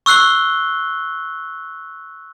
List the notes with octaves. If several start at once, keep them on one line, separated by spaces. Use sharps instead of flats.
C#6 E6 F#6 C7 G7